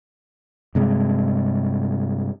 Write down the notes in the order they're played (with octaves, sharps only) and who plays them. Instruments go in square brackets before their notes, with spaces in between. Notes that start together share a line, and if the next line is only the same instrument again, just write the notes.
[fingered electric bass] G2 C3 G#3